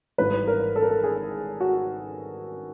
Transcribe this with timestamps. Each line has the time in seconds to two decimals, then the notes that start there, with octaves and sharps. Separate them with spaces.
0.18 G#1 G#2 E3 G3 B4
0.47 A#4
0.76 A4
0.82 A#4
0.90 A4
1.04 G#4
1.60 F#4